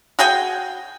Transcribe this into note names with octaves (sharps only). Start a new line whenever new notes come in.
F#4 G#4 G5 G#5